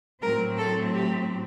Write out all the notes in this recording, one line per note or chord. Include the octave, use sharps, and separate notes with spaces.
A2 F#3 C4 A#4
A4
G4